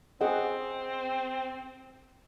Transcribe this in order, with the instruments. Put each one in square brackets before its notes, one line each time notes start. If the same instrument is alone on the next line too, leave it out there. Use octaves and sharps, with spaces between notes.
[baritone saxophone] C4 [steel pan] G#4 D#5 F#5